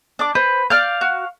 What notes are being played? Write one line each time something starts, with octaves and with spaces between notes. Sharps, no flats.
D4 D6
B4 C5
D5 F5 F6 G6
F#4